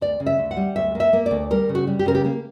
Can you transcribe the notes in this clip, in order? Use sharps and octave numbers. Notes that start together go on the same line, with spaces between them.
D2 D5
C#3
E5
D2
F#5
G3
D2 E5
A#3
E5
A#3
D2 D5
G3 A#4
C#3
F#4
G3
G4
C#3 A#4
G4
A#3